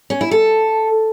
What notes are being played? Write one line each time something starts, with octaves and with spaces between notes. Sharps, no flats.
C#4
E4
A4